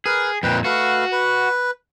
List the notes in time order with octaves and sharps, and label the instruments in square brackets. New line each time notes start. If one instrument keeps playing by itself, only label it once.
[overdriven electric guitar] G#4 [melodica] A#4 B4
[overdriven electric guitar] F2 A#2 [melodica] B4 G5
[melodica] A3 B4 F5 [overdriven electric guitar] F#4
[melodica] B4